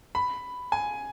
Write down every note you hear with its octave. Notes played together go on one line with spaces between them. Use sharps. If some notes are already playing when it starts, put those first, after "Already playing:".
B5
G#5